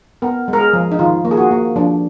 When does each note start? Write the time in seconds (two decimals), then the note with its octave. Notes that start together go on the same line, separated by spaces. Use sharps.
0.22 B3 A#4
0.48 G#3
0.53 A#4
0.61 G#4
0.73 F3
0.92 D#4
0.99 D#3 F4
1.25 A#3
1.31 G#4
1.37 F#4
1.51 A#3
1.76 F3 D4